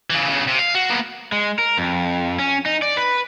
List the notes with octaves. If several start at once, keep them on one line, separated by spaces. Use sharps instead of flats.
C#3 E3
B1 C#3
C3
F5
F#4
A#3 B3
G#3
A#4
F2
C#4
D#4
D5
B4